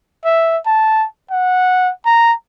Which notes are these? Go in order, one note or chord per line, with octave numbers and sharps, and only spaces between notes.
E5
A5
F#5
A#5